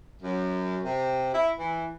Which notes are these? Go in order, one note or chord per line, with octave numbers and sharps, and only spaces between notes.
F#2
C3
E4
E3